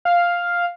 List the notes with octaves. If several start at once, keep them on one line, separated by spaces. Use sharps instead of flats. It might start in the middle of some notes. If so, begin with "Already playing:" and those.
F5